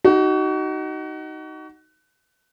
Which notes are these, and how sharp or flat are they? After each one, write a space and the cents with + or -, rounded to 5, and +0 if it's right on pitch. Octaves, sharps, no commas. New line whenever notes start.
D#4 +0 F#4 +30